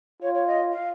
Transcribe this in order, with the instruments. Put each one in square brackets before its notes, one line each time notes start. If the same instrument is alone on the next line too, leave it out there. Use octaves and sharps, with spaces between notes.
[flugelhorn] F4 [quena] C#5
[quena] C#5
D#5
F5